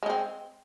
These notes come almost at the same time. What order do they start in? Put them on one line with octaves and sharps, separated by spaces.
G#3 D#4 C4